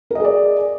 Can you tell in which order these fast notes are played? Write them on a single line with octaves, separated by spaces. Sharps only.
A#4 D#5 G#4 D5